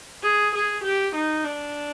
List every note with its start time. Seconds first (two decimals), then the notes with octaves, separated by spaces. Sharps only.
0.23 G#4
0.54 G#4
0.83 G4
1.14 D#4
1.44 D4